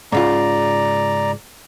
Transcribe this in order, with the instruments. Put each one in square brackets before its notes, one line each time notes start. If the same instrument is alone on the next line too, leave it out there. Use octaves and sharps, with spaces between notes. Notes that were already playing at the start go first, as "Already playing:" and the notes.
[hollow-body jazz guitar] G#2 C#3 F4 [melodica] D5 A#5